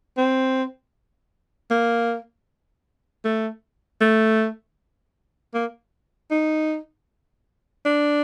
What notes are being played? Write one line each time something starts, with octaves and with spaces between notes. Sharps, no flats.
C4
A#3
A3
A3
A#3
D#4
D4